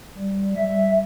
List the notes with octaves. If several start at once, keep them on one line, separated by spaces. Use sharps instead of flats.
G3
E5